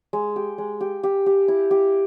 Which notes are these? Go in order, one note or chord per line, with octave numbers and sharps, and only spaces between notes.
G#3
G4
G#3
G4
G4
G4
E4
G4